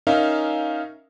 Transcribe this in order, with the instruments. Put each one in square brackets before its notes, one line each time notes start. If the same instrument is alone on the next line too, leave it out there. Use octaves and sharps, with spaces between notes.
[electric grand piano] C#4 D#4 A#4 E5 F5